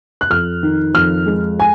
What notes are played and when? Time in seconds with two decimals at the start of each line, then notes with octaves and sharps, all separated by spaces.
0.21 F#6
0.30 F2 F6
0.63 D#3
0.94 F2 F6
1.26 G#3
1.60 G#5